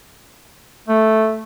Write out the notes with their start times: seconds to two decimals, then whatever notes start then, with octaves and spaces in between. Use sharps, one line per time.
0.88 A3